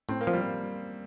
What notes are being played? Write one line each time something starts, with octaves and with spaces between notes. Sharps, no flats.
A2 C4
A#3
F3
G3